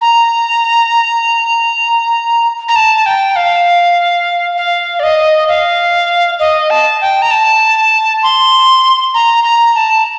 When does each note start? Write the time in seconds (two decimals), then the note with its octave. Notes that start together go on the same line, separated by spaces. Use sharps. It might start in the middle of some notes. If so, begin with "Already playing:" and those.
0.01 A#5
2.68 A#5
2.76 A5
3.06 G5
3.36 F5
4.58 F5
5.00 D5
5.03 D#5
5.49 F5
6.40 D#5
6.70 A5
7.02 G5
7.22 A#5
7.31 A5
8.23 C6
9.14 A#5
9.44 A#5
9.75 A5